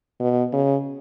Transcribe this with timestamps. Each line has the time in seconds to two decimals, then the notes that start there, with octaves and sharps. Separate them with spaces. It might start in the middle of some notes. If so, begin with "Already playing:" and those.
0.20 B2
0.53 C#3